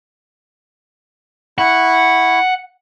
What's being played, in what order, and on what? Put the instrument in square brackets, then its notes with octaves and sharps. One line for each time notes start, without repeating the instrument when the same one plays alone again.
[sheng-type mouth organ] E4 B5 C#6 [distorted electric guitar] F#5